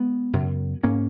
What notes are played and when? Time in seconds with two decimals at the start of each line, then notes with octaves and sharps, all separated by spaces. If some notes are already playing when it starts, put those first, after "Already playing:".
Already playing: G#3 B3
0.33 F#2 C#3
0.83 G#2 A#3 C#4